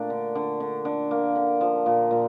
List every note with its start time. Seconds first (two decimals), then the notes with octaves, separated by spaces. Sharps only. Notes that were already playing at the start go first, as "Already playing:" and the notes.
Already playing: A#2 A3 D4
0.10 D3
0.35 D3
0.60 D3
0.85 D3
1.11 A#3
1.36 D3
1.61 F3
1.86 A#2
2.11 A#2